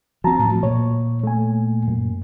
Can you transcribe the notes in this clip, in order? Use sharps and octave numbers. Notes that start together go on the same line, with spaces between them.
F3 C4 F#4 A5 A#5
A2 F3 F#3
A#2 C#5
A3 G#5
F#2